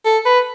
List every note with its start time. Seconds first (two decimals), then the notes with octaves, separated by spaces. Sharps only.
0.05 A4
0.25 B4